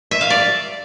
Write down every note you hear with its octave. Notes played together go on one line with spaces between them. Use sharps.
E5
F5
D5